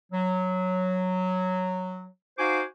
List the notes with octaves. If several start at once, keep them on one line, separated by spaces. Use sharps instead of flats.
F#3
D#4 F#4 C5 F5 G#5 D6